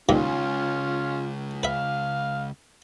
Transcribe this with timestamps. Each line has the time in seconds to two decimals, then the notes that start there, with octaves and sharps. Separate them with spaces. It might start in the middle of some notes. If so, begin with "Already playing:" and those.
0.09 C#2 G2 A#2 D#3 C#4 F4
1.63 B4 E5 F5